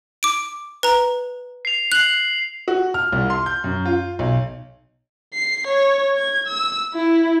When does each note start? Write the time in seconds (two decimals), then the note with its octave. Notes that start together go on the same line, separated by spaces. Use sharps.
0.23 D6 D7
0.83 B4 A#5
1.65 C7 F7
1.92 F#6 C7 F#7
2.68 F#4
2.94 F6
3.12 C2
3.30 C6
3.46 G6
3.64 F#2
3.85 F4
4.19 B1
5.34 C7
5.67 C#5
6.16 G#6
6.47 E6
6.95 E4